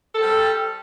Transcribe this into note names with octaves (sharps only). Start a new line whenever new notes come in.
G3 C4 A4